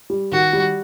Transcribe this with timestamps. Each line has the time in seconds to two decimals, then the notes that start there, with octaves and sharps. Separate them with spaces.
0.10 G3
0.32 D#3 F#4
0.53 G3